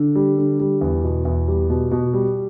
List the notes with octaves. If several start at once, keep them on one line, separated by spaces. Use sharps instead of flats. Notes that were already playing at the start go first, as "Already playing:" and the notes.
Already playing: D3
G3
D3
G3
E2
B2
E2
G3
B2
B2
G3